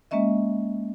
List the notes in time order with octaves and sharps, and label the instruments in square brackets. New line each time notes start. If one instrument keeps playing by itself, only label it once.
[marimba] G#3 A#3 C#4 D#5 E5